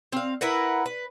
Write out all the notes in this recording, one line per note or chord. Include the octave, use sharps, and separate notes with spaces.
C4 F5
E4 A#4 B4 F#5
B4